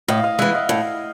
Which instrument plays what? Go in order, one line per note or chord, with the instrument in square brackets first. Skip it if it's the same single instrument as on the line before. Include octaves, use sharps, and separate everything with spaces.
[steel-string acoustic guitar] A2 [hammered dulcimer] D#5 F5
[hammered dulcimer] D#5 F5
[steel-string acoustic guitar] E3 G#3 [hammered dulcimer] E5 F#5
[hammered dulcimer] D#5 F5
[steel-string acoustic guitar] A2